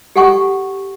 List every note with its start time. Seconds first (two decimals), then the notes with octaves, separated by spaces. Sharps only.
0.16 G4 A4 F#5 G#5 C#6